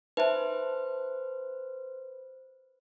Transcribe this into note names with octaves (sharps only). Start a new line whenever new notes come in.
D#4 B4 C5 E5 A5